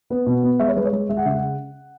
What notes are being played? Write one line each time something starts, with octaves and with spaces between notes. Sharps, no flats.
B3 B4
B2
B3
G#3 E5
C#5
G#3 B4
C#5
G#3
G#3 E5
F#5
C#3 E5
F#5